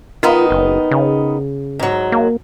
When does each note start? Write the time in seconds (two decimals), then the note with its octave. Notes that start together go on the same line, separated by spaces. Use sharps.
0.23 D#3 B3 D#4 F4
0.51 F#1
0.91 C#3
1.79 G#2 F#3
2.12 A#3